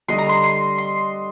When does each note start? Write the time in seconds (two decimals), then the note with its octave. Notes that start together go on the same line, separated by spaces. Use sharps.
0.08 D3 G3 D4 A4 D#5 C6
0.18 A#5
0.29 C6
0.44 C6
0.78 C6